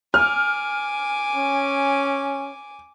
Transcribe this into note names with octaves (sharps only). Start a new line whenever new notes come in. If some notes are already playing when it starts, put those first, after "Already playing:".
G#5 D6 F6
C#4